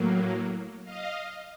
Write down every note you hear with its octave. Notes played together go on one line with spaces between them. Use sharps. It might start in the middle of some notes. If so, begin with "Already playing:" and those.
Already playing: A2 F#3 A#3
D#5 F5